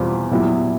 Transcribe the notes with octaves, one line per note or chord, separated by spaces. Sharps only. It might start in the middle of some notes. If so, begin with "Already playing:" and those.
Already playing: E2 B2 G3 C4 F4
A#2 F#3 B3 E4 G4